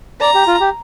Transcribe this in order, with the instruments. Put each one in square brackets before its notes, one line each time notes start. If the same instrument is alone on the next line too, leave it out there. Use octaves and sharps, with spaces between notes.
[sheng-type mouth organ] D5 [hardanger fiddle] A#5
[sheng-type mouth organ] G4
F4
G4